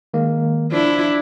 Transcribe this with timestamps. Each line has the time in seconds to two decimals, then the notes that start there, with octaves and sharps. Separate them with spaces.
0.14 D#3 G#3 A#3
0.72 F3 D4 E4